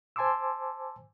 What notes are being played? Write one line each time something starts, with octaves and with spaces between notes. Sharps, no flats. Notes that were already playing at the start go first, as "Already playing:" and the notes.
C5 G#5 A5 C6 D6 E6